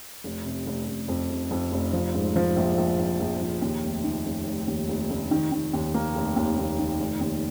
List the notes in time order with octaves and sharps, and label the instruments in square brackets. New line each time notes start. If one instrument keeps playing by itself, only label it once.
[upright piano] F1
C3
F1
F1
F2
F1
F2
F1
F3
G#2
F3
A#1
A#1
A#1
A#1
A#1
D#2
F1
D#3
F1
F1
D#2
F1
F1
D#3
D#3
D#2
A#3
F1
D#2
D#2
D#3
F1
D#2